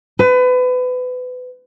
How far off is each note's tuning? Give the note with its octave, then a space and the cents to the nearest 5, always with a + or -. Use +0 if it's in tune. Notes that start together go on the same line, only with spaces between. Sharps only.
B4 +30